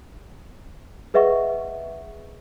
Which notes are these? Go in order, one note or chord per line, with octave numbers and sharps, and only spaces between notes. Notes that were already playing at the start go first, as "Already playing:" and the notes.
G#4 B4 D#5 E5 F#5 C#6